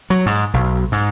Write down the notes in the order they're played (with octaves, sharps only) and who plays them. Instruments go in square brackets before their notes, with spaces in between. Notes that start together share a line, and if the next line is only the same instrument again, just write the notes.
[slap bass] F#3
G#2
B1
G#2